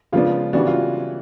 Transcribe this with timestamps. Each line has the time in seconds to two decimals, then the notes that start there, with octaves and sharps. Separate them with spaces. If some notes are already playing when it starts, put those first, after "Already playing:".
0.12 C#3 F3 G#3 B3 D4 F4
0.53 C#3 E3 G3 B3 D4 F#4
0.67 F4